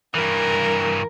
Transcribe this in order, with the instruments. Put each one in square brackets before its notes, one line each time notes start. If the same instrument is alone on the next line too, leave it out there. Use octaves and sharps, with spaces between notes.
[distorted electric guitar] G2 E3 [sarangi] A#4